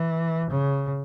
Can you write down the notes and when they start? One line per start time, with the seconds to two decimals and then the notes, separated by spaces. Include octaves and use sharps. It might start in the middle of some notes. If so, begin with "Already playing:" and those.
Already playing: E3
0.50 C#3